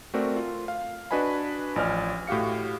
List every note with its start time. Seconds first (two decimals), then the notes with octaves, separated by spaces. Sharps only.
0.14 A3 C4 F#4 A#4 D5
0.36 F4
0.68 F5
1.11 D4 F#4 B4 D#5 G#5 B5
1.76 A1 F3 D5 D#5 G#5 F6
2.27 A2 F#4 G4 F5 C#7